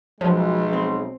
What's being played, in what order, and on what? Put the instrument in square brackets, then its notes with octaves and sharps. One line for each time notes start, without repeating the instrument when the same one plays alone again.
[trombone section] B1 [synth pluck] F3 [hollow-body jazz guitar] F#3 [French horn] G#3
[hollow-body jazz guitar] C4